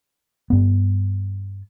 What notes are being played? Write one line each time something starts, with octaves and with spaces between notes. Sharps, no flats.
G2 B3